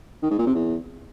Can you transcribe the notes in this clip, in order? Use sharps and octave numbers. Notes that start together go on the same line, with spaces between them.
D#3
G#2
A#2
C3
E2